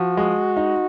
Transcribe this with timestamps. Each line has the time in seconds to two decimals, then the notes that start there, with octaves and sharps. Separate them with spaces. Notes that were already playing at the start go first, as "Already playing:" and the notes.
Already playing: F3 F#4
0.17 G#3
0.57 D#4